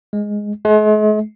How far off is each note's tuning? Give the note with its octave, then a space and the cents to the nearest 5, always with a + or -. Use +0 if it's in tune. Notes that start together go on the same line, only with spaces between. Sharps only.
G#3 +0
G#3 +45